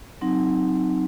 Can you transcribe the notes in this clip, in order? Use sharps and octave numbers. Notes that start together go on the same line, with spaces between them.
F#3 C4 D#4